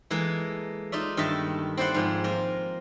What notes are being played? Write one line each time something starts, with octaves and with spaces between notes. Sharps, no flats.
E3 G#3 A#3 A4
D#4 F4 D5 E5
G2 D#3 A4 D#5 E5 A5
C4 E4 C5 D5 F#5 C6
G#2 F3 G#3
A#3 F4 A#4